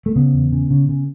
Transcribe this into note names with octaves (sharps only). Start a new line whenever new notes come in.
A3
C#3 B3
E2
C#3
C#3
C#3